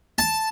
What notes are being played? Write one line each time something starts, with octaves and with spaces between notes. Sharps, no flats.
A5